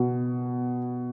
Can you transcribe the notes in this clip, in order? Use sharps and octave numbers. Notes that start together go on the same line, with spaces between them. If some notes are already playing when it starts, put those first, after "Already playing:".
Already playing: B2